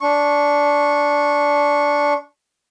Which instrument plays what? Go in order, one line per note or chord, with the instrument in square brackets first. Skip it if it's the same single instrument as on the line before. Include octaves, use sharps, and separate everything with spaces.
[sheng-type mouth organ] D4 C#6